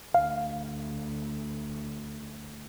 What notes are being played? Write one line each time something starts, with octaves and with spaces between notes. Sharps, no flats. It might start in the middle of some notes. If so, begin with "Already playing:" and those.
D2 F5